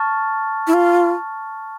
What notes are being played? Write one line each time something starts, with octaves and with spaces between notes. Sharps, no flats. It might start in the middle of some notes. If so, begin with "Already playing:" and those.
Already playing: A5 C#6 F6 A6
E4
F4